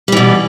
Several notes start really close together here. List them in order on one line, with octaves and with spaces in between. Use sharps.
G3 E3 B2